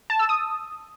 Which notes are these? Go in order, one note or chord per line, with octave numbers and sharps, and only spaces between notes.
A5
E6
D#6